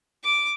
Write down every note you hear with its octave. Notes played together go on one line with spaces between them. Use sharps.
D6